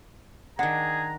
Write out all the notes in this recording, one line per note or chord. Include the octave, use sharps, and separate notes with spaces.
D#3 D4 G#4 F#5 A#5